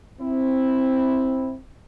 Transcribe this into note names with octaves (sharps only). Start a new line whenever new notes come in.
C4 E4